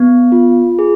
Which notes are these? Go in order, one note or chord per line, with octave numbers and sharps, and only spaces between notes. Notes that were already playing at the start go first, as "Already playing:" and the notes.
Already playing: B3
F4
G#4